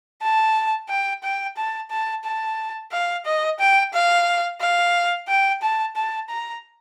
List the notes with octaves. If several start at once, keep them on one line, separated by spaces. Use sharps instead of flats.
A5
G5
G5
A5
A5
A5
F5
D#5
G5
F5
F5
G5
A5
A5
A#5